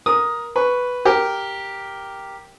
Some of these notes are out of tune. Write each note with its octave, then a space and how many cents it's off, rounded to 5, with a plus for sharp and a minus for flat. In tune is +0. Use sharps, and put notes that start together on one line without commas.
A#4 +15 D#6 +0
B4 +0 C#6 +0
G4 +0 A#4 +0